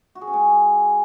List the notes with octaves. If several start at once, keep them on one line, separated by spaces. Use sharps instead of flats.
F#4
G#4
C#4
G#3